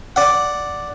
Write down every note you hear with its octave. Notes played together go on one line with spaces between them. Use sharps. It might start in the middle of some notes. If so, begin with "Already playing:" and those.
D5 F#5